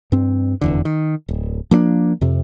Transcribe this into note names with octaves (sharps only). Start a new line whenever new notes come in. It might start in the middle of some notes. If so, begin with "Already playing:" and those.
G2 C4
F1 E2 D3
D#3
D1
F3 A#3 C4 D4
F2 C3